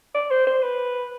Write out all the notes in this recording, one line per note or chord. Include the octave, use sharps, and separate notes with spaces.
D5
C5
C5
B4